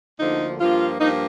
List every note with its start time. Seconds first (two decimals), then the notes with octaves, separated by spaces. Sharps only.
0.20 D2 D3 F3 A#3 D#4
0.60 G2 F3 A#3 F4
0.99 G2 F3 A#3 D#4